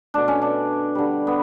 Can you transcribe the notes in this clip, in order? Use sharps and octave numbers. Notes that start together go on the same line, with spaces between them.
B2 A3 D4
C#4
D4
D3 G3
B3